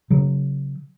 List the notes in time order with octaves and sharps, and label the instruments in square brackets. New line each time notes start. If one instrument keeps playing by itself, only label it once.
[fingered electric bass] C#3 F#3